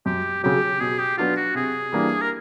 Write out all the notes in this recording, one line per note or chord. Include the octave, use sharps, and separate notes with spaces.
F#2 G4
C#3 F#3 G4
B2 G#4
G4
F#3 B3 D4 F4 F#4
F#4
C3 G#4
E3 G3 A#3 D4
A#4